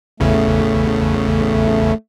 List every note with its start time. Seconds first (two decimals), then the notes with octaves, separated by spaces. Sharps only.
0.20 A1 E2 C#3 A3